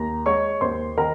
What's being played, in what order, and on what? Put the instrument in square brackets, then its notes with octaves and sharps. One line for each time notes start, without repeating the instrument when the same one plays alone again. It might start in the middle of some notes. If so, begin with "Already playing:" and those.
Already playing: [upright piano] D#2 A#5
G#3 C#5 C#6
D#2 C5 C6
D#3 A#4 A#5